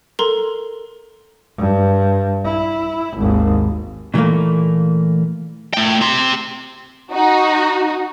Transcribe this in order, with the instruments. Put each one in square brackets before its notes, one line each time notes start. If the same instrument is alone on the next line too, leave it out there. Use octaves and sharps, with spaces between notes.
[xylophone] A4 A#4 A#5 C6 G7
[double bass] G2
E4
G#1 D#2
[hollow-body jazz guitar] A#2 E3 G3 A3 A#3
[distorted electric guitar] A3 G5
G4 C6
[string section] D#4 F#4